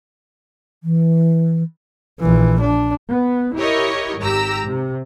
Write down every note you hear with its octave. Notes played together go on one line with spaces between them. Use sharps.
E3
A#1 E3
D4
B3
E4 G4 A#4 C#5 D#5
G#1 G4 A#5 E6
C3